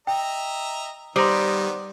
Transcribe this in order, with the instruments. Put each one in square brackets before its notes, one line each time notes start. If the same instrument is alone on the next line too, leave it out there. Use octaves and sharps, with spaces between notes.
[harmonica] D#5 E5 A#5 [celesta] G5
[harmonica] D#3 B3 [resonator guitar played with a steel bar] G3 [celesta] C5 C6 [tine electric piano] A#5 D6 D#6